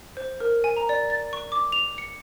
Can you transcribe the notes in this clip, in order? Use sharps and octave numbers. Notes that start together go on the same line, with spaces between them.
C5
A#4
G#5
A#5
D5
A6
C#6
D6
F7
C#7